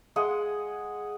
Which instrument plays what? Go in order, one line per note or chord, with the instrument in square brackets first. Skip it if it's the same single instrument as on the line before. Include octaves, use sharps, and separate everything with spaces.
[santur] G#3 G#4 D#5 F#5